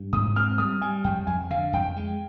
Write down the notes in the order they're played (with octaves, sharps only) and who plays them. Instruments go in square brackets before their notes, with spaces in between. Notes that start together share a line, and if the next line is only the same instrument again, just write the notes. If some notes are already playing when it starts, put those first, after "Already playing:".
Already playing: [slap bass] G2
[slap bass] G#2 [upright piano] D#6
[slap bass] C4 [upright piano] F6
[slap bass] G3 [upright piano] D#6
[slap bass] G3 [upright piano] G#5
[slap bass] F2 [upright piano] G5
[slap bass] F2 [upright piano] G#5
[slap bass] D3 [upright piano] F5
[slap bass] F2 [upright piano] G5
[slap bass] G#3